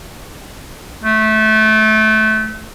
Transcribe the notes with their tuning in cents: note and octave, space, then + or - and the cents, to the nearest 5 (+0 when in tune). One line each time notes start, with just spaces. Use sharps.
A3 -20